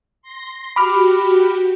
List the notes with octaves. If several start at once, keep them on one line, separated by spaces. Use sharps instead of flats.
C6 A#6
F#4 G4 B5 D6 F6